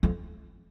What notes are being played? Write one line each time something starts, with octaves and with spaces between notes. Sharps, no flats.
F2